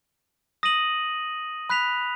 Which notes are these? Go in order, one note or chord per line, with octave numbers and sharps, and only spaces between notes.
D#6 A#6 D#7 F#7
B5 F#6 B6 F7